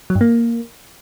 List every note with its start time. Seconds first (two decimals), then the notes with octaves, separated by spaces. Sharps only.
0.10 F#3
0.15 G2
0.21 A#3